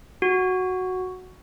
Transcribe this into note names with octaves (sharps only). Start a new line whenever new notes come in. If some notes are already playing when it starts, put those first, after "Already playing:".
F#4